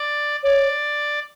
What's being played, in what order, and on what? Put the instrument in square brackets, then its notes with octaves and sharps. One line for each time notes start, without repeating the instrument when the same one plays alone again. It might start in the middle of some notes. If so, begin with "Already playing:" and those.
Already playing: [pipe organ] D5
[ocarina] C#5 [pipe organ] D5